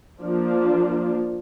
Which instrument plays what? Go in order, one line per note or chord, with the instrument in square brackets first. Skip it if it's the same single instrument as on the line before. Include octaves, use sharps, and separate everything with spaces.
[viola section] F3 A#3 D4 F4